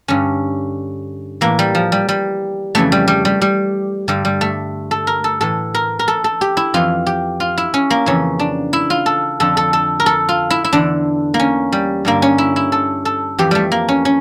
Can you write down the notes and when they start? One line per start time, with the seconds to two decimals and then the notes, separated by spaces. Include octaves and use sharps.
0.08 G2 D3 C#4
1.41 A2 E3 A#3
1.59 G3
1.75 F3
1.92 G3
2.09 G3
2.75 F2 C#3 E3 A3
2.92 G3
3.08 G3
3.25 G3
3.41 G3
4.08 G2 D3 G3
4.25 G3
4.41 A3
4.91 A4
5.07 A#4
5.24 A4
5.41 A2 E3 A4
5.75 A#4
5.99 A#4
6.08 A4
6.24 A4
6.41 G4
6.57 E4
6.74 F2 E3 F4
7.06 G4
7.40 F4
7.58 E4
7.74 C#4
7.90 A#3
8.06 F2 C#3 E3 C#4
8.39 D4
8.73 E4
8.90 F4
9.06 A4
9.40 F2 D3 A4
9.57 A4
9.73 A4
10.00 A#4
10.06 A4
10.29 F4
10.50 E4
10.64 E4
10.73 E2 D3 D4
11.34 A#3
11.40 C#4
11.72 G3
12.05 G2 D3 A#3
12.22 C#4
12.38 E4
12.56 E4
12.72 A4
13.05 A4
13.38 F2 E3 G4
13.51 G3 A3
13.72 A#3
13.88 C#4
14.05 C#4